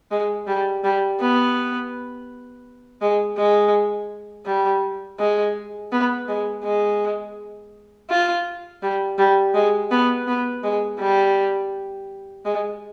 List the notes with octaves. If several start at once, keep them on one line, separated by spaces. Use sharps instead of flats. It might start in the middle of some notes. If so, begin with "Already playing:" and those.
G#3
G3
G3
B3
G#3
G#3
G3
G#3
B3
G#3
G#3
F4
G3
G3
G#3
B3
B3
G#3
G3
G#3